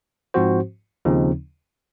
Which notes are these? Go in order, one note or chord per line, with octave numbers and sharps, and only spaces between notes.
G#2 F3 C4 F#4 C5
D#2 C#3 F3 C4 D#4